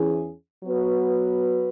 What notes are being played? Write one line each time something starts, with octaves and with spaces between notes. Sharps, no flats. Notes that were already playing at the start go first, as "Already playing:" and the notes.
Already playing: E2 E3 C#4 E4 G#4
F#3 B3 F#4 B4